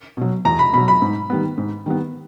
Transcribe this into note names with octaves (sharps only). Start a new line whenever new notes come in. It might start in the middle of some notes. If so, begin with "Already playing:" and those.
B2 F#3
E2 A#5
B5
B2 F#3 B5
B5
G#2
D#3 G3 B3
G#2
D#3 G3 B3